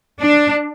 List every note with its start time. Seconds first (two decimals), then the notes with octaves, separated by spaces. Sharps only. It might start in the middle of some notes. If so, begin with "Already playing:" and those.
0.20 D4